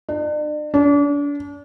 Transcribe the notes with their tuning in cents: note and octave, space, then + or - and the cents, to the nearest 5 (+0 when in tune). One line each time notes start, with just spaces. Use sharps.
D4 +40
D4 -35